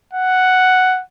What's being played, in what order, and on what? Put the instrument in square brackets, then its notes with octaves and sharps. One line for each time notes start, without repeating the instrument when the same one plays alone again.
[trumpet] F#5